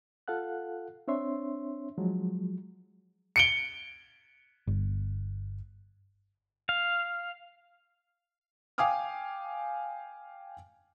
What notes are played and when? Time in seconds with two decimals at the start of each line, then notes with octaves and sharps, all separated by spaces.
0.28 F4 A4 F5 F#5 F#6
1.08 C4 D4 C#5 E5 C6
1.98 F3 F#3 G#3
3.36 C#7 D7 G7
4.67 G1
6.69 F5
8.78 F5 G5 G#5 D6 D#6 F6